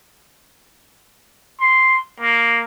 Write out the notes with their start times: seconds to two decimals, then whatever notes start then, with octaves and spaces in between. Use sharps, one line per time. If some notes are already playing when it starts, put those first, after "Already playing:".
1.60 C6
2.20 A#3